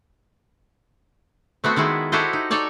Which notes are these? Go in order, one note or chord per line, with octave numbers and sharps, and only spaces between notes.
A3 B3 C4 F#4
D#3 G#3 B3 E4
E4 F#4 G4 A4 C5 D#5
D#4
D#4 A4 C#5 D5 A5